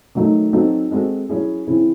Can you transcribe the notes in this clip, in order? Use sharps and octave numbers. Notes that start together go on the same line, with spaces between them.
D#3 F#3 A3 D#4
F#3 C4 D#4 F#4 A4
G#3 C4 F#4 A4
F#3 C#4 E4 G#4
C#3 E3 C4 E4 G#4